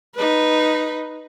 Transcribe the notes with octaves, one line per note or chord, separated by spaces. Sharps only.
D#4 B4